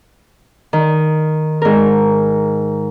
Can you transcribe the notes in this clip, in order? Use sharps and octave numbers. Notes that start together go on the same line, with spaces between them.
D#3
G#2 A#4